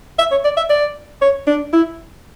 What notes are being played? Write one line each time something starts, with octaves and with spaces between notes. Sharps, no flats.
E5
C#5
D5
E5
D5
C#5
D4
E4